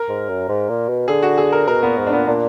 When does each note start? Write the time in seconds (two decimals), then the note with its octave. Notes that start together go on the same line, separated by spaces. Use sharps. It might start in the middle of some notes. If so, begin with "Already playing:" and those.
Already playing: A#4
0.09 G#2
0.29 F#2
0.48 G#2
0.69 A#2
0.89 B2
1.08 D3 G#4
1.23 F#4
1.38 G#4
1.52 A#4
1.68 B2 A#4
1.83 A#2 B3
1.97 G#2
2.07 D4
2.13 A#2 B3
2.27 A#2 D4